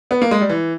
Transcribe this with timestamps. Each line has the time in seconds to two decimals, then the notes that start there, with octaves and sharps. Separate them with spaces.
0.11 B3
0.22 A#3
0.31 G#3
0.41 G3
0.49 E3